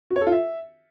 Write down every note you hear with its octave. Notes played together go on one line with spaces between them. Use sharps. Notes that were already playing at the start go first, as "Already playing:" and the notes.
F#4
C#5
A4
F4
E5